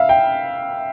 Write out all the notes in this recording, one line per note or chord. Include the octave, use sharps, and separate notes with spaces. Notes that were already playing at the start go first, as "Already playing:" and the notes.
Already playing: E5 F5
G5